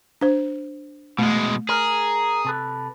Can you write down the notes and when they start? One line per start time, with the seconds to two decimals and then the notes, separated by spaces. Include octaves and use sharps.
0.21 D4 C5
1.19 B2 G#3 A3
1.69 G#4 A#4
2.45 C3 A4 B4